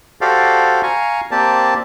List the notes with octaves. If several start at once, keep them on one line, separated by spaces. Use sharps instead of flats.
F#4 G4 A4 C5 D5 F5
F5 G#5 A#5 C#6
A#3 C4 G4 D5 A5